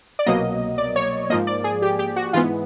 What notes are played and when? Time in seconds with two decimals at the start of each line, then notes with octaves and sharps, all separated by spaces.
0.19 D5
0.26 C2 B2 F#3 A#3 D#5
0.78 D5
0.96 C#5
1.30 G#2 F3 A#3 D#5
1.47 D5
1.64 G#4
1.82 G4
1.99 G4
2.16 F#4
2.33 G#2 E3 G#3 B3 F4